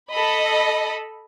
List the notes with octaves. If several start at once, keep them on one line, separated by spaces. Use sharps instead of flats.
A4 D#5 B5